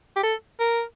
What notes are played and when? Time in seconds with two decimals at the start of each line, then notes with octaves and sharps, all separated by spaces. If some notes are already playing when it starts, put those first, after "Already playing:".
0.16 G4
0.23 A4
0.60 A#4